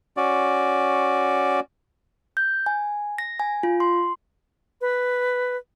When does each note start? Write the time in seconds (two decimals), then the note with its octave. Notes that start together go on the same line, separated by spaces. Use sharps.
0.17 C#4 F#4 D5
2.37 G6
2.66 G#5
3.18 A#6
3.40 G#5
3.63 F4
3.80 C6
4.81 B4